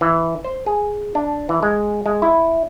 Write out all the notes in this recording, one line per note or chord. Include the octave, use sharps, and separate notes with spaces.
E3
C5
G#4
D4
E3
G#3
G#3
E4